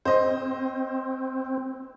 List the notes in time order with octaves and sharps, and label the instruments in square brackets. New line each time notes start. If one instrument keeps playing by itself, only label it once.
[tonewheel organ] C4 [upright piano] C5 D#5